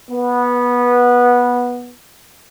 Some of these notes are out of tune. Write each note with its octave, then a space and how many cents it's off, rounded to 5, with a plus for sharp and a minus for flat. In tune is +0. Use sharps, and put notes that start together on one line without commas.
B3 -15